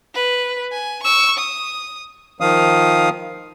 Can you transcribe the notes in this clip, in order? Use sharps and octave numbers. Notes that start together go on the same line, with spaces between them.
B4
G#5
C#6 E6
D#6
D#3 F3 F5 D#6